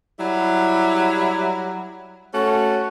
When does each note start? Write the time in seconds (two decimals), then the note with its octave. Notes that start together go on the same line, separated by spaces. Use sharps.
0.18 F#3 G3 E4
2.33 A3 C#4 F#4